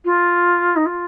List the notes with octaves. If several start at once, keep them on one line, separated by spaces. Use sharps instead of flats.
F4
D#4
F4